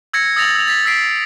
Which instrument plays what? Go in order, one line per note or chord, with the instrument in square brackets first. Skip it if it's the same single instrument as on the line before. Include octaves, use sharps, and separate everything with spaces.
[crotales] E6 G#6 A#6 C#7
D#6 E6 A6 A#6 F7 F#7
E6 A6 F7
A6 B6
E6 A6 B6 C7 D7